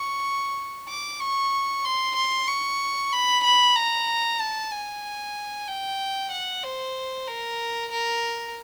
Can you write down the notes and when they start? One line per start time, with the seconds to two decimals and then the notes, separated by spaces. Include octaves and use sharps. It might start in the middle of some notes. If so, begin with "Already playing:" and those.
Already playing: C#6
0.89 D6
1.20 C#6
1.85 C6
2.16 C6
2.48 C#6
3.13 B5
3.44 B5
3.75 A#5
4.40 A5
4.71 G#5
5.68 G5
6.31 F#5
6.64 C5
7.27 A#4
7.92 A#4